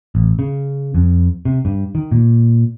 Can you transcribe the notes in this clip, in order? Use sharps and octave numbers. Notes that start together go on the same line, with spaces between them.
A1
C#3
F2
C3
G2
D#3
A#2